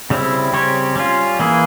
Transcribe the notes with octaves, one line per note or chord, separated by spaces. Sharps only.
C#3 G3 C4 E4
C#3 G3 C4 G4 C#5
G3 C#4 F4
E3 A#3 E4 G#4